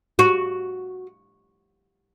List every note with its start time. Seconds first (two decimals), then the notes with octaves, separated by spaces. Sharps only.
0.19 F#4